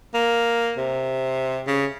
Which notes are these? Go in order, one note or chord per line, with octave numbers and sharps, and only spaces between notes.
A#3
C3
C#3